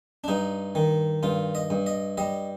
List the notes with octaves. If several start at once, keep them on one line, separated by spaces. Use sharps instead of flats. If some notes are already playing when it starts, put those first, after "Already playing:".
D4
G2 D#4
D#3
G2 F4
D#5
G2
D#5
G3 D#5